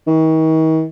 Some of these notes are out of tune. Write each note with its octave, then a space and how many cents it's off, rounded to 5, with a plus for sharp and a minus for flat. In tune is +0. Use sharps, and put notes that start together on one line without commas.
D#3 +40